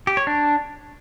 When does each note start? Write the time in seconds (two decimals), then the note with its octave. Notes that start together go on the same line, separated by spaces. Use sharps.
0.07 G4
0.17 C#5
0.27 D4